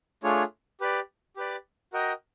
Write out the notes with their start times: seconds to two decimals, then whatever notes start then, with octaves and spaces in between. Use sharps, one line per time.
0.23 A3 D4 F4 G#4 C#5
0.81 G4 B4 D5
1.37 G4 B4 D5
1.93 F#4 A#4 D#5 G5